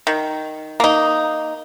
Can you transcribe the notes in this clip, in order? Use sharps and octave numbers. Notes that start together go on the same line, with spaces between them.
D#3
A#3 D#4